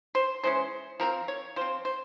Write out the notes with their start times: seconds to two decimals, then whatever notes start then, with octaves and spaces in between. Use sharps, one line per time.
0.15 C5
0.44 E3 G#3 C#4 C5
1.00 F3 C4 A#4
1.28 C#5
1.56 F3 C5
1.61 C4
1.85 C5